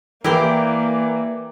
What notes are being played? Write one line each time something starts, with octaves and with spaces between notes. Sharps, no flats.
E3 A#3 E4 G4 A#4 C5 D5 G5